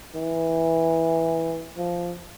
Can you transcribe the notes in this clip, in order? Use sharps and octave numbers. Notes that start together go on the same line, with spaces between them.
E3
F3